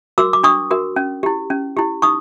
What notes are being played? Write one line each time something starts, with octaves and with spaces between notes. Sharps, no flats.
F#4 A#4 D6 E6
D6
D4 C#6 D#6
F#4 A#4
C#4
E4 G4
C#4
E4 G4
D#4 C#6 D#6